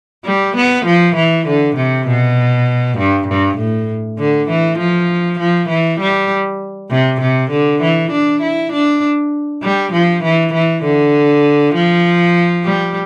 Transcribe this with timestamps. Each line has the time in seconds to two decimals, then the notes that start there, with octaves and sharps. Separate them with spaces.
0.25 G3
0.56 B3
0.86 F3
1.16 E3
1.47 D3
1.76 C3
2.07 B2
2.98 G2
3.28 G2
3.58 A2
4.18 D3
4.49 E3
4.79 F3
5.39 F3
5.69 E3
6.00 G3
6.90 C3
7.21 C3
7.51 D3
7.82 E3
8.11 D4
8.42 E4
8.72 D4
9.63 G3
9.92 F3
10.23 E3
10.54 E3
10.84 D3
11.75 F3
12.65 G3